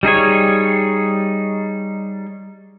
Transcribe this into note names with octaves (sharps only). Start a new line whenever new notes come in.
G3 D#4 G#4 C#5